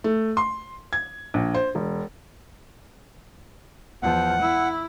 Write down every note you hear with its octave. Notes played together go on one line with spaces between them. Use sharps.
A3
C6
G#6
A#1
C5
E1
E2 F3 F#5
E4